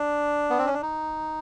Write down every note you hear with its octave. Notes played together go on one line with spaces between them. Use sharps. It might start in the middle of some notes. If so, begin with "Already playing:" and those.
Already playing: D4
B3
C4
C#4
D4
D#4